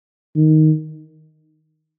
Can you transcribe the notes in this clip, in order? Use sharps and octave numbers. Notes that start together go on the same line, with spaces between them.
D#3